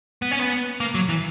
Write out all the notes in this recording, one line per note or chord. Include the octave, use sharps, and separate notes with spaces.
B3
C#4
B3
A#3
F#3
E3